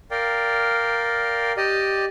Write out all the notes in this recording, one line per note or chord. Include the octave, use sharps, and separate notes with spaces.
A#4 D5 F5 G5
G4 D5 D#5